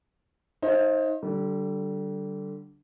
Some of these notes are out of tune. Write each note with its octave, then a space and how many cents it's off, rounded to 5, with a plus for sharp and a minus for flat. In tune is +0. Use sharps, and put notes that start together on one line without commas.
D#4 +20 C5 +30 F5 -35
D3 +0 G3 -25